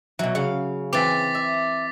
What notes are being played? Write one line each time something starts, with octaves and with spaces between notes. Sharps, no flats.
B2 E3 F#3
C#3 F5 F#5
E3 C4 D6 A6 B6
E5